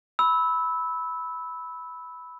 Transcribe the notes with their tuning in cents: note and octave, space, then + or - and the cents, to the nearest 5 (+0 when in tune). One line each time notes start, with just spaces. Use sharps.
B5 +0 E6 -15